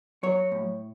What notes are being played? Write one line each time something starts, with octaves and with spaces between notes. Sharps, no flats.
F#3 C#5
A2